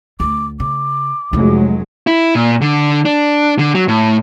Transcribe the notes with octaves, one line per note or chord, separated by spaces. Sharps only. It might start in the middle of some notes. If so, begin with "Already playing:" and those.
D2 D6
C#3 D6
F1 F#3 G#3 A3 E4
E4
A#2
D3
D4
D3
F#3
A2